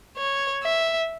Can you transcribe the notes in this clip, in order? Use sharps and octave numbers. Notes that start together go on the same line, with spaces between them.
C#5
E5